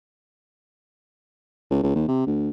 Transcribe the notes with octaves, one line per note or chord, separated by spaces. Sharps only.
C#2
C#2
D#2
C3
D2